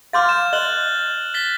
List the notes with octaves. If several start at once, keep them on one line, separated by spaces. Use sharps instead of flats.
F5 C6 D6 F6 G6 A6
E7
D#5 F#6 F#7 G7
A6 B6 G7